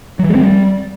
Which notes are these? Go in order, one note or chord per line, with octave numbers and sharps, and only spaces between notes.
F#3
E3
G#3
C4
G3